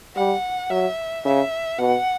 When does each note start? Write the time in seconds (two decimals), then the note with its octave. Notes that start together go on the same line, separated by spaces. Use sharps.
0.16 G3 F#5
0.70 F#3 E5
1.25 C#3 E5
1.79 B2 F#5